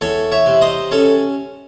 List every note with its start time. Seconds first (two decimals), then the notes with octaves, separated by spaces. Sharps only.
0.01 E2 A4 C#5
0.32 C#5 E5
0.46 C3
0.61 C5 D#5
0.91 C#4 A4 C#5